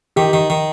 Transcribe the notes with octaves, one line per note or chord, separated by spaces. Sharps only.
D#3 G4
D#3
D#3